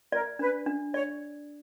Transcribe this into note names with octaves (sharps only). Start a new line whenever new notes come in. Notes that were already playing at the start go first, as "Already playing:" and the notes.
A#4 D5
D4 B4
D4
C#5 D5